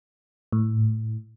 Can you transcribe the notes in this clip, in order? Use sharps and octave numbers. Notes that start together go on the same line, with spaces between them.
A2